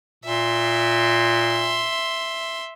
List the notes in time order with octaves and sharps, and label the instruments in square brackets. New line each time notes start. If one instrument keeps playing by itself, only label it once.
[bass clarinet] A#2 [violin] E5 C6